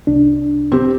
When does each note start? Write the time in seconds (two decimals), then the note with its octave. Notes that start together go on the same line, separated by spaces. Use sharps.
0.07 C2 D4
0.72 C4 G4